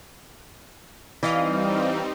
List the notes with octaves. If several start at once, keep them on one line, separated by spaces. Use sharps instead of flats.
E3 G3 C4 D#4 D5 D#5 F5